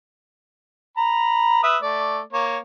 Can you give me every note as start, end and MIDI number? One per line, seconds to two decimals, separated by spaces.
0.97 1.60 82
0.97 1.60 83
1.63 1.77 71
1.63 1.77 76
1.63 1.77 87
1.82 2.20 57
1.82 2.20 74
2.33 2.58 58
2.33 2.58 73